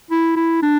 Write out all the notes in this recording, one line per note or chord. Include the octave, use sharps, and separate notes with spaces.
E4
E4
D4